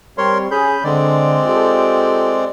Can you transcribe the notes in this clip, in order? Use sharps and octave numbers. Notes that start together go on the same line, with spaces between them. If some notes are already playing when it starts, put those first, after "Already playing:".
G3 C4 A#4 C#5 C6
C#4 G#4 B5 G6
D3 G#3 C4 D5
F4 G4 A4